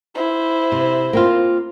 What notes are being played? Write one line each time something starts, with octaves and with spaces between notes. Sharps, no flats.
E4 C5
C3
A#3 C4 F4